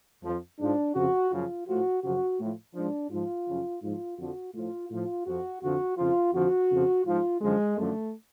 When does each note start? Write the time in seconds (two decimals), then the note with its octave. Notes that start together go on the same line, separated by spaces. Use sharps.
0.23 F2 F3
0.59 G#2 F3 D4
0.95 F2 C#3 F3 F#4
1.31 F#2 C#3 F3 F4
1.67 A2 F3 F#4
2.03 F#2 C#3 F3 F#4
2.39 A2 F3
2.75 G#2 F3 D4
3.10 G#2 F3 F4
3.47 F#2 C#3 F3
3.82 G#2 F3 F4
4.18 F2 D3 F3 F#4
4.54 A2 F3 F4
4.90 A2 F3 F4
5.26 F2 F3 F#4
5.62 F2 D3 F3 F#4
5.97 F2 C#3 F3 F4
6.33 F2 D3 F3 F#4
6.70 F2 C#3 F3
7.06 G#2 F3 F4
7.41 F#2 D3 F3 G#3
7.77 F#2 D3 F3 A3